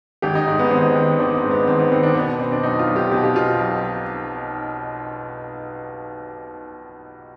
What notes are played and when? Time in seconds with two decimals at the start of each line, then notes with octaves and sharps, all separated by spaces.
0.22 G#1 G4
0.35 D#4
0.47 G#2
0.59 B3
0.71 G#1 C4
0.95 D#3
1.19 G#1 D4
1.35 C4
1.44 G#2
1.51 B3
1.67 G#1 C4
1.79 B3
1.92 D#3 C4
2.03 D4
2.15 B2 B3
2.27 B3
2.39 B2 C4
2.52 D4
2.63 B1 D#4
2.79 F4
2.87 B1
2.96 G4
3.12 B2 G4
3.24 G4
3.36 B2 F4
3.48 F4
3.59 B1